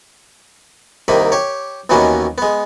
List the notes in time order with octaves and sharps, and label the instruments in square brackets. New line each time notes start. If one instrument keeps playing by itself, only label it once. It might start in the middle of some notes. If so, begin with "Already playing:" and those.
[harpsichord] C2 C3 D#3 A#3 B5
G4 C#5
D#2 B2 E3 A#3 B3 C#4
G#3 B3